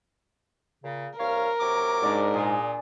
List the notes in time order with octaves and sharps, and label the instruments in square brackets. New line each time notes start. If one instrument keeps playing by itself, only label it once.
[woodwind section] A#2 C#3
[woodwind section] C2 C#5 F5 [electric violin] A#4
[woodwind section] C3 F#3 D6
[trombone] G#2 [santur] D4 D5
[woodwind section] A#2 [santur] G#4